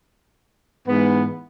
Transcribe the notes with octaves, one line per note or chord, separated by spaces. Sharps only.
G#2 E3 B3